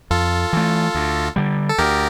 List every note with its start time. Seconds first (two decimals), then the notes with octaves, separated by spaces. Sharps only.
0.11 F2 F4 A4
0.53 E3 A3
0.95 D2
1.36 D3 G3
1.69 A4
1.78 D2 G4 A#4